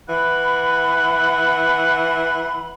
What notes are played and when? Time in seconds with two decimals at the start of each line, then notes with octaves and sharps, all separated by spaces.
0.09 E3 F#5 B5